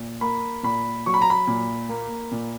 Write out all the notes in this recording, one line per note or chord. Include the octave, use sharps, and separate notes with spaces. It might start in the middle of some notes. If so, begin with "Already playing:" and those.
Already playing: A#2
A#3 B5
A#2 B5
F#3 C#6
B5
A#5
B5
A#2
A#3
A#2